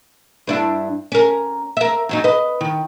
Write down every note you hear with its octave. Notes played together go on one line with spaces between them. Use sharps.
G2 D4 E4
C#4 A#4
A#4 E5
F#2 F#3 D#4
B4 D#5
D#3